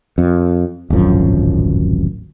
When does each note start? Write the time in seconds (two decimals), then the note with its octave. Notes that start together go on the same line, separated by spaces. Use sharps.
0.18 F2
0.90 D1 G#1 F#2 F3